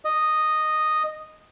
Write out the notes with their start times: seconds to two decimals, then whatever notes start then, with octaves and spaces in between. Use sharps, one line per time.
0.05 D#5